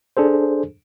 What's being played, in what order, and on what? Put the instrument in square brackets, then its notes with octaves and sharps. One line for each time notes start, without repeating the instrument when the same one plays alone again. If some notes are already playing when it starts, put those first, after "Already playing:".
[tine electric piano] D4 G#4 A4 C5